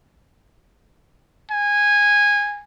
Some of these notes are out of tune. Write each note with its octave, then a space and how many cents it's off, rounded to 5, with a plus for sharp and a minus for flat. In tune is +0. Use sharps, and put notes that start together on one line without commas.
G#5 -15